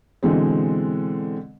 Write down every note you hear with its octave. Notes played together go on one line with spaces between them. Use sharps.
B2 D3 E3 G#3 C4